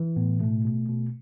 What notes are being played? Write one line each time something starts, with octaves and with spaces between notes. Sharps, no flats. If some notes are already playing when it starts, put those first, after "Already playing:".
Already playing: E3
A2 B3
B2 A3
B2
B2